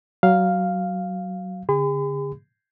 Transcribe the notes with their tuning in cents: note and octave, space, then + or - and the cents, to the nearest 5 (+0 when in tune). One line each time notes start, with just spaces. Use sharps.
F#3 +15 F5 +0
D3 -40 G#4 -40 B5 +45